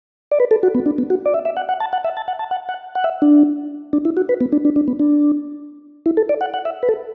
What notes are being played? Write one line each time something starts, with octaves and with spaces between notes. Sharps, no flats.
D5
B4
A4
F#4
B3
D4
B3
F#4
D5
E5
E5
F#5
F#5
A5
F#5
E5
A5
F#5
A5
F#5
F#5
F#5
E5
D4
D4
E4
F#4
B4
B3
D4
D4
D4
B3
D4
E4
A4
D5
F#5
F#5
E5
B4
A4